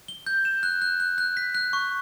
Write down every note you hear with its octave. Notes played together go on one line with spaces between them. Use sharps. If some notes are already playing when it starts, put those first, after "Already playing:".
G7
G6
E7
F#6
F#6
F#6
F#6
B6
F#6
C#6